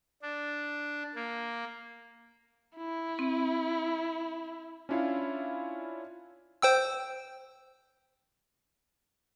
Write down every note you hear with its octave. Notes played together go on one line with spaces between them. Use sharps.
D4
A#3
E4
C4
C#4 D4 E4 F4 C#5 F5
C5 G5 E6